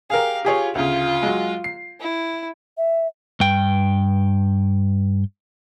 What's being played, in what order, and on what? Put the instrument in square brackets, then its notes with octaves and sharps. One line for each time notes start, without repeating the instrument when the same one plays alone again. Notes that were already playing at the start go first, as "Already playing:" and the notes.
[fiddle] G4 F5 [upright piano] G#4 A#4
[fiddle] F4 [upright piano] G4 G#4 C#5
[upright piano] D2 C#3 [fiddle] F4
[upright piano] F#3 G#3
C7
[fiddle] E4
[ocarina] E5
[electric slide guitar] G2 G5